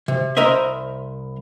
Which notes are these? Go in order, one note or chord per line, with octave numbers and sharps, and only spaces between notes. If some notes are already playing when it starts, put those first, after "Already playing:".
C3
C2 A#4 C5 D#5 E5